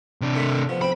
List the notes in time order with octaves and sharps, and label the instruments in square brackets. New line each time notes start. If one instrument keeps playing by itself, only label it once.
[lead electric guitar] C3 D4
[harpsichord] D#3 A3 B5
F3 B3
[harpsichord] B1 C4 G5 [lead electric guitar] B5